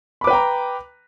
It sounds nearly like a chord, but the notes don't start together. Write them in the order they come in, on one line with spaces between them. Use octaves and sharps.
B5 D6 B4 G5 A#5